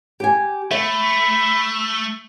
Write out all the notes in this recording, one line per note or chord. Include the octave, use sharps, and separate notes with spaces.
G4 G#5
A3 E5 B5